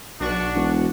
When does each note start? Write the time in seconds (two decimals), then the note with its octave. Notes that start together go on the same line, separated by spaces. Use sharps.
0.20 B1 D4 F#4 C#6
0.55 E1